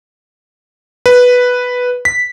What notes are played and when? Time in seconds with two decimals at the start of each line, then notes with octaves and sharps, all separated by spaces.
1.06 B4
2.05 B6